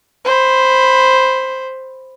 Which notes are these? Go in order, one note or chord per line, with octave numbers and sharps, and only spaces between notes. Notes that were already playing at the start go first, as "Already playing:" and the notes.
C5 B5